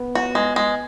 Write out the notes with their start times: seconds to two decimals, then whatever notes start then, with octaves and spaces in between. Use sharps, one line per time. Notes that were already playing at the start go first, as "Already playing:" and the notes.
Already playing: B3
0.15 F#4
0.35 G#3
0.56 G#3